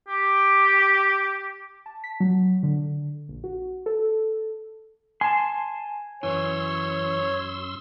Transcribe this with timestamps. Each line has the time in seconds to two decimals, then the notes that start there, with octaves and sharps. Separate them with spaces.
0.08 G4
1.86 A5
2.04 B6
2.20 F#3
2.63 D3
3.29 A#1
3.44 F#4
3.86 A4
5.21 G#5 A5 C6
6.23 F#2 E3 C#5 C6 E6